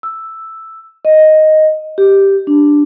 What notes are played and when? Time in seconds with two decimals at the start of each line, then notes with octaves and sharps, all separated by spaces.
0.03 E6
1.05 D#5
1.98 G4
2.47 D4